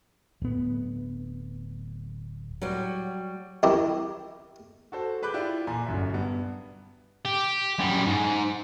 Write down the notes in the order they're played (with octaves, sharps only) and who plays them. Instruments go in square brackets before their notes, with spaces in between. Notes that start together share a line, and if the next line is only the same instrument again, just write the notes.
[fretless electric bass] D1 B3
[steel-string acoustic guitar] F#3 G3
[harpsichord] C2 D#3 D#4 E4 G4
[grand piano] F#4 A4 C5
G#4 B4 B5 D6 F#6 G6
E4 F4 G4 D5
A#2 G#5 A#5
G1 F#2 E5
G2 B3
[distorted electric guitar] G4
F#2 G3
G#2